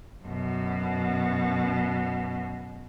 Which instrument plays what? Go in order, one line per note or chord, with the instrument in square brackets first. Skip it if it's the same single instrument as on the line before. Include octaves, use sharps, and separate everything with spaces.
[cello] F#2 B2